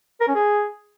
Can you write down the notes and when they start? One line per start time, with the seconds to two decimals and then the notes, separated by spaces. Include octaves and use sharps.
0.21 A#4
0.28 C#4
0.35 G#4